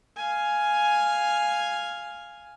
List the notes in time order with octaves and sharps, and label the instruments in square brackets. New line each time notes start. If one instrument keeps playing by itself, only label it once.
[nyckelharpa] F5 G#5